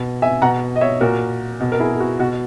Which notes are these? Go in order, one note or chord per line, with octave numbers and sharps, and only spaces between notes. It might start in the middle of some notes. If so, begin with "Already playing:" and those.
Already playing: B2
E5 G#5
B2 F#5 A#5
D#5
C#5 E5
A#2 F#4 A#4
B2
A#4
E4 G#4
G#4
F#4
B2 F#4